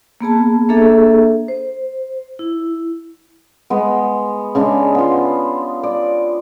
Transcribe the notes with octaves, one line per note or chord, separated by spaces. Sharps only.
A#3 B3 G#4 A5
A#3 D4 G#4 A4 E5
C5
E4
G#3 B3
C#3 G#3 D4 G4
B3 F4
D5